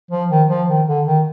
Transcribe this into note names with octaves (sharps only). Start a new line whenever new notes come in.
F3
D#3
F3
D#3
D3
D#3